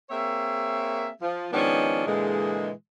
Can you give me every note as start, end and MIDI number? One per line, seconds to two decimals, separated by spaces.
0.10 1.08 58
0.10 1.08 60
0.10 1.08 68
0.10 1.08 73
0.10 1.08 76
1.22 1.48 53
1.52 2.03 51
1.52 2.03 53
1.52 2.03 56
1.52 2.03 59
1.52 2.03 61
1.52 2.03 62
2.06 2.71 46
2.06 2.71 50
2.06 2.71 52
2.06 2.71 56